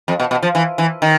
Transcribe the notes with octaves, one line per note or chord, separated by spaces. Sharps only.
F2
B2
B2
F3
E3
E3
D#3